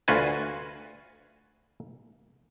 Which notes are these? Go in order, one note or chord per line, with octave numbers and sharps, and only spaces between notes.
D2 F4 F#4 B4 G#5